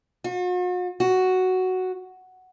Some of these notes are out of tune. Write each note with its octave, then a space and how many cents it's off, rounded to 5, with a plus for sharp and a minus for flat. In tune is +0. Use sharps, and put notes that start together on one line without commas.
F#4 -45
F#4 +5